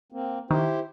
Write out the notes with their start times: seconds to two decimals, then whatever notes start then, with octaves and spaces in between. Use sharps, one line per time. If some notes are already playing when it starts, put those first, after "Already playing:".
0.12 A#3 C4
0.51 D#3 E4 G4 C5